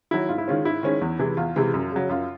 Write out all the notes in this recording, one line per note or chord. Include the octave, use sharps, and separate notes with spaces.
D#3 F#3 E4
G#2 F4
E4
D#3 G#3 C#4 F4
G#2 E4
D#3 G#3 C#4
E2
C3 E3 G#3
E2 F4
C3 E3 G#3
F#2
C#3 F#3
F#2 F4